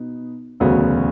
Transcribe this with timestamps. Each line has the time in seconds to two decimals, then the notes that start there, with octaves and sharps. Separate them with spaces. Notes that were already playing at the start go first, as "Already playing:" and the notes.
Already playing: B2 B3 D#4
0.60 E1 D2 C#3 F#3 B3